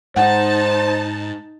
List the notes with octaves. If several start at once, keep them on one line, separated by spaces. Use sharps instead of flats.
G#2 D#4 C5 F#5 A5